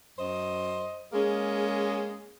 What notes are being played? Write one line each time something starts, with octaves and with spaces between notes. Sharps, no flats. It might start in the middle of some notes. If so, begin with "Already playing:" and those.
F#2 C5 D#5
G#3 A#3 C#4 G#4